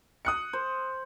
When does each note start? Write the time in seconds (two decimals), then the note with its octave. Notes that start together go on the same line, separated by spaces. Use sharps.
0.25 D#6 F#6 C#7
0.53 C5